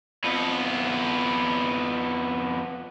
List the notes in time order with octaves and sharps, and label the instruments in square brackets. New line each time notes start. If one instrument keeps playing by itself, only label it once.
[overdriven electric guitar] F2 B3